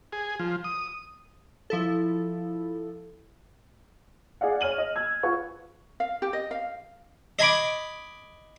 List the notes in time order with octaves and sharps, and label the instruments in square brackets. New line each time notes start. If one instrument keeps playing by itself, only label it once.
[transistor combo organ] G#4
F3
D#6
[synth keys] F3 E4 A4
[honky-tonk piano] G#4 D5 F5 F#5
C#5 F6 D#7 F#7
D#5
E6 G#6
F4 B4 F#5 C#6
[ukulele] F5
G4
D#5
F5
[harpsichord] D#5 G#5 B5 D6